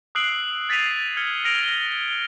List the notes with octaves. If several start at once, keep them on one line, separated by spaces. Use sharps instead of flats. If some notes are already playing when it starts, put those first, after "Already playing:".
D#6 E6 F#6 C7 D7 F#7
G#6 A6 B6 C7 D#7 F7
F6 G#6 C#7 G7
F6 A#6 D7 F7 G7